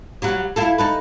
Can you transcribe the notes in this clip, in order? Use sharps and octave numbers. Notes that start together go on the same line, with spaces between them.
F#3 G3 F#4
E4 F4 A4
D#4 A4 B4